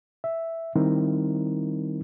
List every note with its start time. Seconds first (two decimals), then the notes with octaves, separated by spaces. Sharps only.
0.24 E5
0.75 D#3 G3 C4 D#4 E4 A#4